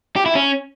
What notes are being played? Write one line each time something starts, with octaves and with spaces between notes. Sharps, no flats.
G4
E4
C#4